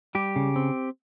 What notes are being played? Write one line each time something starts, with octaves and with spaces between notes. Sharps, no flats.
G3 G4
C#3
C4